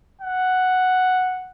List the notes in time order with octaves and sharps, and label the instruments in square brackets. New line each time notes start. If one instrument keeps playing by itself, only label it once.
[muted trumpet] F#5